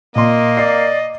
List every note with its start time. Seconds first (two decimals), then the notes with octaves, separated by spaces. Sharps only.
0.16 A#2 A#3 D#5 C6
0.57 D5 D6 C7